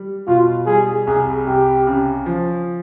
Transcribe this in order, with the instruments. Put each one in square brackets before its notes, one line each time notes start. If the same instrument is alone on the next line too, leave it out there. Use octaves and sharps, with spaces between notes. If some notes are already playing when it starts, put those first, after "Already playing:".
Already playing: [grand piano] G3
[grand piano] B2 [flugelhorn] F4
[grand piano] G3 [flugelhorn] G#4
[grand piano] C2 [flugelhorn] G#4
[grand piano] C2 [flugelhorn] G4
[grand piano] C#3
F3